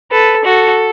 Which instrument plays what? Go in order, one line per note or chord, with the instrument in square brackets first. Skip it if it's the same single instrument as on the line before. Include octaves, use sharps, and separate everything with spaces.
[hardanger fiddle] A4 [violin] B4
[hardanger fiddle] F#4 [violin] A4